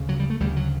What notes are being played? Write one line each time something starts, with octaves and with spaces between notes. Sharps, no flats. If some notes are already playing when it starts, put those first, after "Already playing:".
Already playing: D2 C#3
F#3
G3
A3
D2 C#3 G3
F#3